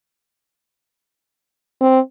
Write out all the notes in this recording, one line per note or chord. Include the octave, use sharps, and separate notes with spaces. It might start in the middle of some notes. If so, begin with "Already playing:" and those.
C4